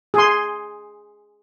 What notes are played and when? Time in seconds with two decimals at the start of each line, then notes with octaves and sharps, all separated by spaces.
0.14 G#4 C6